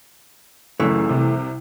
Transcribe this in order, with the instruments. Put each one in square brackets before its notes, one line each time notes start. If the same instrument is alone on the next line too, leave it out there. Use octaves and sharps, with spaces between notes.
[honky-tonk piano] C#2 F#2 [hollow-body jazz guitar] E3 A3
[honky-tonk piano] C2 C3